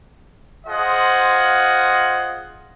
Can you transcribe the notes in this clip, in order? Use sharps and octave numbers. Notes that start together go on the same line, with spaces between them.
F4 G#4 C5 D#5 F#5